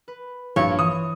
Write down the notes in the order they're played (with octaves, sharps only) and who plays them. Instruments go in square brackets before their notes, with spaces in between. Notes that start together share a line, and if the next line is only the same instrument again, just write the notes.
[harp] B4
[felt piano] A#1 F4 [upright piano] G2 [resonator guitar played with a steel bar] C#5
[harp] E3 [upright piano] D#6